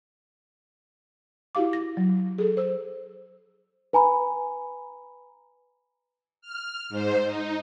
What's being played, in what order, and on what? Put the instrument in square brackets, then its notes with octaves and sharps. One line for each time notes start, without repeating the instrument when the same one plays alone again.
[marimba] E4 F#4 G4 F5 D6
A#6
F#3
G#4 A4
C5 E6
[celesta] B4 G#5 A#5 B5
[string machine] F6
G#2 C5
D#4